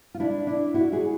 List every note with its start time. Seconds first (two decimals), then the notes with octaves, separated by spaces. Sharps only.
0.14 F4
0.20 D4 E4
0.47 D4 E4
0.74 E4 F#4
0.92 F#4 G#4